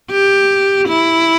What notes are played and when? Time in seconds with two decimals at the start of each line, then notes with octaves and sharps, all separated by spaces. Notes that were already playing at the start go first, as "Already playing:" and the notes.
0.11 G4
0.88 E4